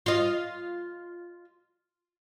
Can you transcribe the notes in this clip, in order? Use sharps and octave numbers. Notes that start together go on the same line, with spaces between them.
F4 D#5